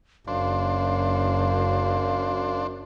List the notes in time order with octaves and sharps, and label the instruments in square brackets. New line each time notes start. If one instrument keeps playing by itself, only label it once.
[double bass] F#1 [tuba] F#2 [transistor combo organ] D4 C5 [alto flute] F5